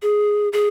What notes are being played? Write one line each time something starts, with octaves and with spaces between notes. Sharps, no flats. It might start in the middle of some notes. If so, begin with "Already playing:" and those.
G#4
G#4